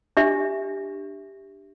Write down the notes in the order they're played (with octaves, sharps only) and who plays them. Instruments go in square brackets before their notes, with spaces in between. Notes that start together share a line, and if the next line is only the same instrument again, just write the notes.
[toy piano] D4 G4 E5